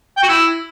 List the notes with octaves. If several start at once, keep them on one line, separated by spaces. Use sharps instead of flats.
G5
F#4
E4